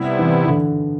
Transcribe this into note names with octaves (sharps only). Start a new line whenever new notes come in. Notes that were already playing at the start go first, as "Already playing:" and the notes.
Already playing: C3 G3 B3 E4
E3
E3
D3